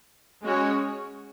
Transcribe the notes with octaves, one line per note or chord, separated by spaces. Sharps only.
G#3 C#4 F#4 C#5